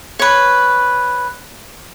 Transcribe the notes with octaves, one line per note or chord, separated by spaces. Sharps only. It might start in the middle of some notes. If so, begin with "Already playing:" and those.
B4 C#5